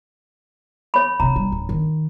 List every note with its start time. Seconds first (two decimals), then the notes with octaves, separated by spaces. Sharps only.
0.94 C#5 B5
1.20 C3 C4 A#5
1.36 G3
1.52 D1
1.69 D#3